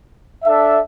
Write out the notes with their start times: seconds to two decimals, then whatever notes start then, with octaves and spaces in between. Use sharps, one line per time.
0.44 D4 A4 E5